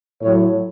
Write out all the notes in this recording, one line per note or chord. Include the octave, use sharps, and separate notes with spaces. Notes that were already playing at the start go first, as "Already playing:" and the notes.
A2 F#3 C#5